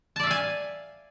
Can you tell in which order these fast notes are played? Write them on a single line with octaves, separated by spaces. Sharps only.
A5 D5 E5 F5 G#5